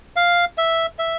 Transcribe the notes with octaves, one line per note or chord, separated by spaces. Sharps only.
F5
E5
E5